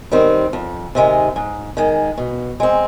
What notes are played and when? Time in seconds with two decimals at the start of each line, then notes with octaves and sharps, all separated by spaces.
0.12 D#3 G3 C4
0.53 F2
0.95 C3 D#3 G#3
1.36 G#2
1.77 D#3 G#3
2.17 B2
2.60 G#3 C4